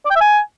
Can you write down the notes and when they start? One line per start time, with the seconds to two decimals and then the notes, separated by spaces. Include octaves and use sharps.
0.05 D5
0.11 G5
0.16 E5
0.21 G#5